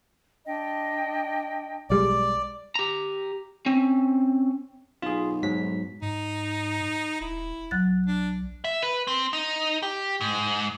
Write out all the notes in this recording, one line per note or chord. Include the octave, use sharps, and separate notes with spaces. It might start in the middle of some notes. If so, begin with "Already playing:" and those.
D4 D#5 G5
B1 G3 G#3 D5
G4 A#5
C4 C#4
B1 F4 G#4
G#2 F#3 B6
G#2 D#4
D#1 E4
B1 F#3 F#6 A6
D4
E5
B4
C4
D#4
G4
G#2